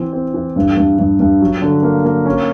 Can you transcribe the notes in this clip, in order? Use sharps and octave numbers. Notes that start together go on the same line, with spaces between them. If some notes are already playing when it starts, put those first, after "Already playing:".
Already playing: E3 C4
C4
E3
G2
G2
G2
G2
F#3
D3
A#3
A#3
C#4